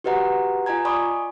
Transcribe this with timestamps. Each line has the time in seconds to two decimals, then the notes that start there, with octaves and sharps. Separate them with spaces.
0.04 F#4 G4 B4 D#5 F#5 A#5
0.66 F4 D#5 G#5 A#5 G#6
0.85 D5 G#5 B5 C#6 D#6